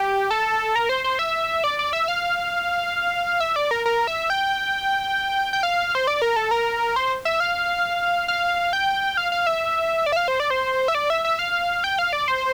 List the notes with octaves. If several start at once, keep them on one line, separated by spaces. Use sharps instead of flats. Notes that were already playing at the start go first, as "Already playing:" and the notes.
Already playing: G4
A4
A#4
C5
C5
E5
D5
D5
E5
F5
E5
D5
A#4
A#4
E5
G5
G5
F5
C5
D5
A#4
A4
A#4
C5
E5
F5
F5
G5
F5
F5
E5
D5
E5
F5
C5
D5
C5
E5
D5
E5
E5
F5
G5
F5
D5
C5